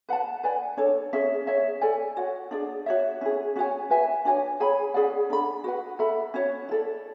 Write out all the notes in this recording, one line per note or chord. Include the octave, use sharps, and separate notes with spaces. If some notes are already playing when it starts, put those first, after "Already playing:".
B4 F#5 A5
B4 D5 G#5
D4 A4 C#5
C#4 G#4 C#5 E5
C#4 G#4 C#5 E5
A4 D5 G#5
F#4 C#5 F#5
D4 G#4 D5
F#4 C#5 E5
C#4 E4 G#4
C#4 F#4 C#5 G#5
F#4 B4 E5 G#5
D4 F#4 C#5 G#5
G#4 C#5 G#5 B5
C#4 G#4 D5 F#5
D4 A4 E5 B5
F#4 B4 F#5
A4 E5 B5
C#4 F#4 C#5
E4 A4 D5